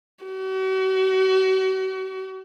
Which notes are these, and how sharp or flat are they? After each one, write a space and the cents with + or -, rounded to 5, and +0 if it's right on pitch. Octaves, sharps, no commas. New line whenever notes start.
F#4 +40